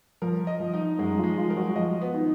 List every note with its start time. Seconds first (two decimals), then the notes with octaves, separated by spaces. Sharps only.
0.22 F3 A#4
0.47 D#5
0.60 F3
0.74 D#4
0.98 F#2 F#3 G#3
1.18 F3 F4
1.24 G#3
1.37 F3 F4
1.50 A#4
1.56 F#3 F#4
1.69 F#4
1.75 F3 F4 D#5
2.01 B3
2.14 D#3 D#4